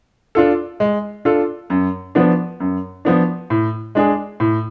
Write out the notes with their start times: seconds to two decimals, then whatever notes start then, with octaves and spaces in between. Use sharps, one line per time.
0.35 D4 F4 A4
0.80 G#3
1.25 D4 F4 A4
1.70 F#2
2.15 F3 B3 D4
2.60 F#2
3.05 F3 B3 D4
3.50 A2
3.95 G#3 D4 G#4
4.40 A2